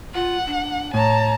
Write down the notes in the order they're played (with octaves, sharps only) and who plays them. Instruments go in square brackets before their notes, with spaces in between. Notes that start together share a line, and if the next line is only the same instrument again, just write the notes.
[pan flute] F4 [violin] F#5
[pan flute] D4
[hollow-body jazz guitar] A2 [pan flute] C#5 [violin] A5 A#5